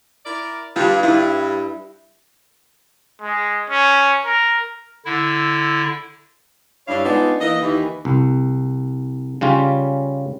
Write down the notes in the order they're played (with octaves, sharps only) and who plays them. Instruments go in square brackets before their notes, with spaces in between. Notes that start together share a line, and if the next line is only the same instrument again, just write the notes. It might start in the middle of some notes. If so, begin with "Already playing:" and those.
[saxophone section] E4 A#4 D5
[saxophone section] G2 [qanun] G3 F4
[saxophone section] G2 [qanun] E4 B4
[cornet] G#3
C#4
A#4
[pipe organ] D3 E4
[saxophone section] G2 D4 E4 C#5 F5
G#3 B3 D4 D#4 F4
E3 A#3 D#5
D#2 D#3 E3
[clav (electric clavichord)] C2
C#3 G3 C#4 F4